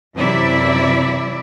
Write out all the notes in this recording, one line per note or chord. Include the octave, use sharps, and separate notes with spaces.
F#2 C3 E3 E4 D5 E5